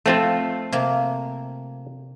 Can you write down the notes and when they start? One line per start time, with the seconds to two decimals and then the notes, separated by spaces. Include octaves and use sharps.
0.06 F3 A3 C4 F4 A4
0.72 C3 A#3